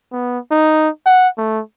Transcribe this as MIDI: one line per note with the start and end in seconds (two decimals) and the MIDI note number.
0.13 0.39 59
0.51 0.89 63
1.06 1.28 78
1.38 1.61 57